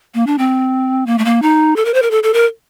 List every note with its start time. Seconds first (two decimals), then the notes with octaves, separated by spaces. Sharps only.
0.14 A#3
0.27 D4
0.38 C4
1.06 A#3
1.18 A3
1.25 A#3
1.42 D#4
1.76 A4
1.85 A#4
1.94 C5
2.02 A#4
2.11 A4
2.23 A4
2.34 A#4